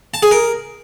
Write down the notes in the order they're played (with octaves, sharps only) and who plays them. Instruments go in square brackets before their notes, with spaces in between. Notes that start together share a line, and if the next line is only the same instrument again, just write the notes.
[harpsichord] A5
G#4
A#4